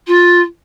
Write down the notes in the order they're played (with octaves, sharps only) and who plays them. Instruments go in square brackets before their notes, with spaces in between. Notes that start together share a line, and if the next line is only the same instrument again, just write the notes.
[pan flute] F4